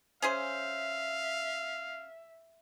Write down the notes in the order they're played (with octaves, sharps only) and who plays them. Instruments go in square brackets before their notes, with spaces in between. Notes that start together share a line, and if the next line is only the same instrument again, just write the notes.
[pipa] C#4 G#4 C5 [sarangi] E5 [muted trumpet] F5